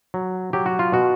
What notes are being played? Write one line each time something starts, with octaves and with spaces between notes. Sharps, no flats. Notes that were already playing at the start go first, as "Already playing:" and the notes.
F#3
F#3 G4
F#4
F4
B2 F#4